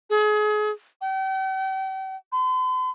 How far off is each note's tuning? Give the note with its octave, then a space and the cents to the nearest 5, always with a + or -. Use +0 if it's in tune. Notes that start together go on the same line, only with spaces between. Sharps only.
G#4 +30
G5 -40
C6 -45